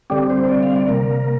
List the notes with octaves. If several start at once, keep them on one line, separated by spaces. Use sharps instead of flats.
D3 G3 C4 G4
C5
D5
F5
D5
C3 A#3 A#4